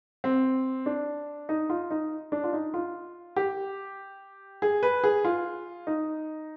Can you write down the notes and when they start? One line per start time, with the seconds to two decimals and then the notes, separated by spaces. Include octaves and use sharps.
0.24 C4
0.86 D4
1.49 D#4
1.70 F4
1.91 D#4
2.32 D4
2.44 F4
2.53 D#4
2.74 F4
3.36 G4
4.62 G#4
4.83 B4
5.04 G#4
5.25 F4
5.87 D#4